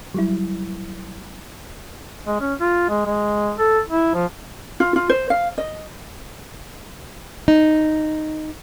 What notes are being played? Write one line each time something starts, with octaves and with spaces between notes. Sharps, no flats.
F#3 G3 E4
G#3
C#4
F4
G#3
G#3
A4
E4
F3
F4
F4
C5
F5
D#5
D#4